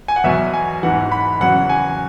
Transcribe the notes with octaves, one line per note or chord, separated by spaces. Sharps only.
G#5
F#5
E2 B2 F#3 E5
G#5
G#2 E3 F#5
B5
E2 C#3 F#3 F#5
G#5